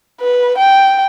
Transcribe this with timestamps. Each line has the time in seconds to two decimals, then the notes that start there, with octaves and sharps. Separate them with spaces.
0.21 B4
0.58 G5